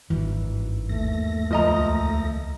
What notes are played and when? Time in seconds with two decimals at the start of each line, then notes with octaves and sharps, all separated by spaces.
0.10 G#1 G2 D#3 E3
0.89 D#2 A3 A#6
1.51 C#2 F3 D#5 A#5